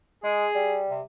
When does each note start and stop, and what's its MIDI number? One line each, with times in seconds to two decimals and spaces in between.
0.24 0.46 56
0.24 0.81 68
0.55 1.00 55
0.90 1.02 48